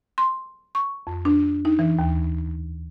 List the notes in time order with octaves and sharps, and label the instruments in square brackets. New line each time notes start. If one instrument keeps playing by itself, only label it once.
[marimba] C6
C#6
F2
D4
D#4
E3
D#2